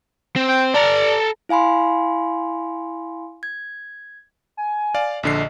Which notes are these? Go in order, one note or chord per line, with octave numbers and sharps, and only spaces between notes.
C4
G5
A4 D5 A#5
E4 F5 G#5 B5 C6
G#6
G#5
D5 F5
A#1 D3 D#5 C7